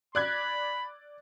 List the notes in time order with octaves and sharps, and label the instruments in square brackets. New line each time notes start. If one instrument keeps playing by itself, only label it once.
[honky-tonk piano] D5 F#6 G#6 [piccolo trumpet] B5